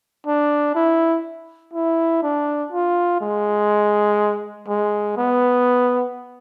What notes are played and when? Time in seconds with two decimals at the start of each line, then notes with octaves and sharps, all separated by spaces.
0.27 D4
0.75 E4
1.74 E4
2.23 D4
2.72 F4
3.21 G#3
4.68 G#3
5.17 B3